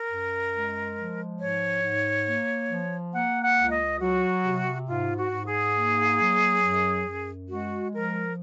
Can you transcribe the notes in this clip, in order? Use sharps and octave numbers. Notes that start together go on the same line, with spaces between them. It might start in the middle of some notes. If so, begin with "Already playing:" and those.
Already playing: A#4
F#2
G#3
F3
G#2 C#5
G#2
A#3
F3
A#3 F#5
F#5
C#2
D#5
F#3 F#4
C3
G#2 F4
F#4
G#2
G#4
A#3
F#3
F#2
F#2
G#3 F#4
F3 A#4